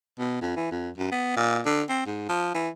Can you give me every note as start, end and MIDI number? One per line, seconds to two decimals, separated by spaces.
0.19 0.37 47
0.41 0.53 41
0.56 0.69 52
0.71 0.90 41
0.98 1.10 42
1.11 1.33 59
1.37 1.60 46
1.66 1.82 50
1.89 2.01 60
2.06 2.25 44
2.29 2.53 53
2.55 2.69 52